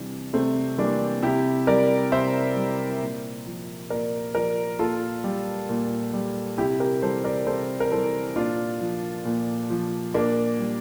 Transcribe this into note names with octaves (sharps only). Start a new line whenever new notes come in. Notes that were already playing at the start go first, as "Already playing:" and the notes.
Already playing: C3 E3 G3 D4
C3 A3 C4
E3 G3 A#3 D4
C3 E4 G4
G3 A#4 D5
C3 C5 E5
G3
A#2
F3
A#2 A#4 D5
F3 A#4 D5
A#2 F4 A4
G3
A#2
G3
C3 E4 G4
G4 A#4
E3 G3 A4 C5
A#4 D5
C3 A4 C5
A#4
E3 G3 A4 C5
A#2 D4 F4
F3
A#2
F3
A#2 A#3 D4
G3